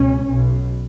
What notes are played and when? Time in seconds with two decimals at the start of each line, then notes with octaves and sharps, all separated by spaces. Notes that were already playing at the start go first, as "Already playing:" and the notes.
Already playing: C#2 B2 C#4
0.28 B1 B2